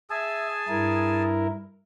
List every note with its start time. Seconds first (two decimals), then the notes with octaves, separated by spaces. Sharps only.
0.10 G#4 E5 G#5 A5
0.68 G2 E4 A#4